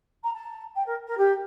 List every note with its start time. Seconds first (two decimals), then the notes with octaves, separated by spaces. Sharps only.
0.23 A#5
0.33 A5
0.75 G5
0.86 A#4
1.07 A#4
1.17 G4